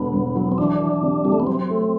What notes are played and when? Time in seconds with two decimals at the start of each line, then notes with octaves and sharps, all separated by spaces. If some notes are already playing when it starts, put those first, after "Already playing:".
Already playing: E1 D3 B3
0.13 E1
0.36 F#3
0.52 C4
0.58 E3 D4
0.80 E3
1.02 C3
1.25 C3 G3
1.32 A3
1.40 B3
1.47 F#3 C4
1.70 A3